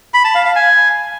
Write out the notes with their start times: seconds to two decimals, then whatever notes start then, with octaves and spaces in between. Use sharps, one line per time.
0.14 B5
0.24 A5
0.35 F5
0.45 F5
0.56 G#5